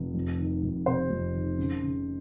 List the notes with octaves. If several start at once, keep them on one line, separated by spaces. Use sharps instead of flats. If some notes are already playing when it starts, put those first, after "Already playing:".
Already playing: F1
F2
D#3
F1
C3 C5
F2
D#3
C#3
C#3